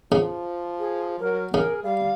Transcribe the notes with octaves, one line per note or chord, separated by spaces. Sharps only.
C#3 F3
G#4
F#3 A#4
C#3 G#4 A#4
G3 F5